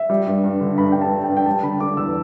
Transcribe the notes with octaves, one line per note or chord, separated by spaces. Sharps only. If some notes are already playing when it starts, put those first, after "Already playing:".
Already playing: E5
G3
G2
G2
D3
G2 B5
G2 G5
A5
G3
G5
G2
G5
G3 A5
D3 B5
D3 D6
E2 E6